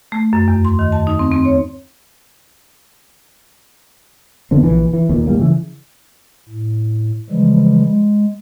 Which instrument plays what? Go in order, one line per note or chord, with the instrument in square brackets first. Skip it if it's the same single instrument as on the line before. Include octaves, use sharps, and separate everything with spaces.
[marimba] A3
F#2
E2
C6
D#3
A5
D#4
C4
C4
C#5
[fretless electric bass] E2 D3 B3 C4
A#1 E3
E3
D#2 A#2
A2 G3 A#3
C#3 E3
[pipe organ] A2
C#3 E3 F3 G3 G#3
G#3